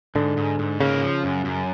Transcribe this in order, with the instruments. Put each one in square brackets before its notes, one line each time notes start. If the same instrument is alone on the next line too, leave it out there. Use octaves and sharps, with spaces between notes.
[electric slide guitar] G#2 [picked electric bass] D3
[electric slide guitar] G#2
G#2
[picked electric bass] C#3 [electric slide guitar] A#3
[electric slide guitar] F3
F#2
F#2